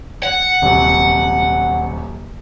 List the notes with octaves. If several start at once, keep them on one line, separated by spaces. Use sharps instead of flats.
F#5
D#1 C3 F#3